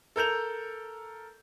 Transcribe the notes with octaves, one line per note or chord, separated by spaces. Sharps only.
A4 A#4 G6 F7